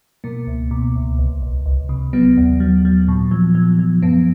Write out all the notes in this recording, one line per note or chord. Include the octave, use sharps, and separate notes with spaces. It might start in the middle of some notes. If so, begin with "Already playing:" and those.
B2 A#3
C#2
B2
C#2
C2
C2
C2
C3
F#3 B3
D#2
F#3
F#3
A#2
F3
F3
F3
F#2 B3